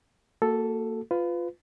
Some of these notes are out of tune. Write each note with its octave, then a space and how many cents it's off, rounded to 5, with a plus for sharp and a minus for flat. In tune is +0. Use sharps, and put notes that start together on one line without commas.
A#3 -30 F#4 +0 A4 +0
F4 +0 B4 +25